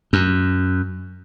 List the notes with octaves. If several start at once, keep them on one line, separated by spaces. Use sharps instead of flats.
F#2